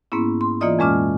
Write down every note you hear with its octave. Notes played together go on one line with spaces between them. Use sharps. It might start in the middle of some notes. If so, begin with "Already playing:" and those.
G#2 A#3 B3 C#4 E4
C6
E3 A#3 F4 D5 D#5 D#6
F2 A#2 G#3 C#4 D6 F6